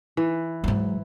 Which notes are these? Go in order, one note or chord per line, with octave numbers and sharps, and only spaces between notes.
E3
G#2 F#3